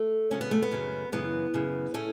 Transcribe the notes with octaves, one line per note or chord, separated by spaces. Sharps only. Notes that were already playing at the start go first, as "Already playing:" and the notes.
Already playing: A3
F#2 C#3 F#3 C#4
B3
A3
B3
F#2 C#3 F#3
F#2 C#3 E3 B3
F#2 C#3 E3
A2 A3 C#4